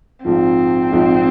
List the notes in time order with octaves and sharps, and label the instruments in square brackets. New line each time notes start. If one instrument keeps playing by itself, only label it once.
[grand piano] A#1 G#2 F3 [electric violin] C4
[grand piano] A#1 G#2 F3